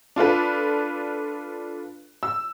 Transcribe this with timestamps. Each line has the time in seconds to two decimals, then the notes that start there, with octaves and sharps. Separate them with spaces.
0.16 D4 F4 A4 B4
2.23 E6